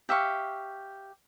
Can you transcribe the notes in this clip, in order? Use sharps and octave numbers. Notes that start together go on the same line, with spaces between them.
G4 E5 F5 C#6